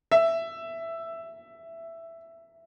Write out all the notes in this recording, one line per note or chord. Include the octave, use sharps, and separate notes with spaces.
E5